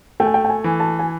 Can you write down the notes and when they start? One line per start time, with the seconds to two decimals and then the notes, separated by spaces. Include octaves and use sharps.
0.20 A3 G5
0.26 G#5
0.34 G5
0.45 G5
0.50 G#5
0.64 E3
0.80 A5
0.99 G#5